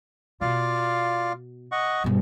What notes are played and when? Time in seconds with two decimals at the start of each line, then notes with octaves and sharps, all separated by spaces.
0.41 B2 F4 D5 F5
1.72 D#5 F#5 C#6
2.04 G2 B2